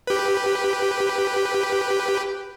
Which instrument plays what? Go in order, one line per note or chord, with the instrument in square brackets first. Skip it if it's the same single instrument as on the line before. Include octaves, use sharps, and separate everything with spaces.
[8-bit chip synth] G4 B4